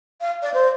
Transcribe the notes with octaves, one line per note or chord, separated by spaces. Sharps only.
F5
D5
C5